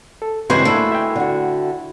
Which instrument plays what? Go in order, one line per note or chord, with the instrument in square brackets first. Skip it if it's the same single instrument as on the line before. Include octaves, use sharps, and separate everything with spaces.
[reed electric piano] A4
[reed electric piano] G2 G#3 C4 [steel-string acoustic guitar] C#3 E3 [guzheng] F#4 C5 G#5
[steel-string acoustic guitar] A3 G#5 [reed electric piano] A#3 D4 F#5 [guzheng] E4
[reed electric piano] E5 G5
[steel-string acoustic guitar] D3 F#4